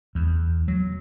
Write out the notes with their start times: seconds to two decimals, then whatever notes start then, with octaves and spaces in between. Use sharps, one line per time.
0.15 E2
0.68 F#3